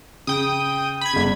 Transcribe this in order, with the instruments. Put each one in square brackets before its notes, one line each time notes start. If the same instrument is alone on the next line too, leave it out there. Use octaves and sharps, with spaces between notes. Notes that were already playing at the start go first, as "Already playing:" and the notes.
[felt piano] C#3 [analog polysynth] G5 D#6
[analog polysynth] B5 G#6
[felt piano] G1 C#3